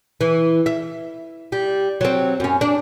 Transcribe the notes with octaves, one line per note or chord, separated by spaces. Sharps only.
E3
E5
G3
F#3 C4
F#2 C#4
D4